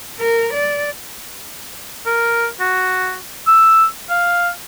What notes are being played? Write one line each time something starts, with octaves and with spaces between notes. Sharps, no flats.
A#4
D5
A#4
F#4
E6
F5